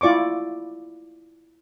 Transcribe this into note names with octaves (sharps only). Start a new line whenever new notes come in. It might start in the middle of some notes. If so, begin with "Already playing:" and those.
E4 F4 D5 C#6 D6